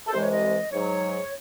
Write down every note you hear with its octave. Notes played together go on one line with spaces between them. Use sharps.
A4
C2 C3 E3 G#3 C5
C#5
D#5
G#2 F#3 C#5